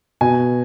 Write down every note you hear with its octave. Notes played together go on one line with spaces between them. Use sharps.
B2 G#5